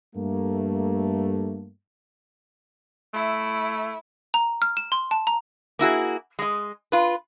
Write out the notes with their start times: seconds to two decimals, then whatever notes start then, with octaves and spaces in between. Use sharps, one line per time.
0.16 G2 A3 A#3
3.14 A3 E4
4.34 A#5
4.62 F6
4.77 E7
4.92 C6
5.11 A5
5.27 A#5
5.79 A#3 E4 F#4 G#4
6.39 G#3 D#5
6.92 F4 B4